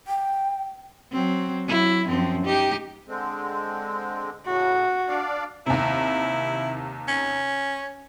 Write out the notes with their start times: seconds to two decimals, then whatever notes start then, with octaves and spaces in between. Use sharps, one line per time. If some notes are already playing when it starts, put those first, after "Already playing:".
0.08 G5
1.12 F#3 C4
1.66 F#3 E4
2.07 F#2 F3 C4
2.45 D#4 G4
3.08 D3 G#3 C4
4.46 A2 C#3 F#4
5.08 D4 D5 F5
5.66 D#2 C3 E4
7.08 C#4